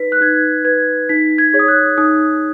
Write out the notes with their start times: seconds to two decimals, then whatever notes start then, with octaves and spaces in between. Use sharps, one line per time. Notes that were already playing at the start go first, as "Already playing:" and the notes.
Already playing: D#4 B4 B6
0.12 F#6
0.21 D#4 G#6
0.65 B4 G#6
1.09 D#4 B6
1.38 G#6
1.53 G#4 C#5
1.59 D#6
1.68 F#6
1.98 D#4 D#6